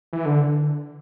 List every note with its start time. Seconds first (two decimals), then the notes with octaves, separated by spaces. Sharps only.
0.13 E3
0.26 D3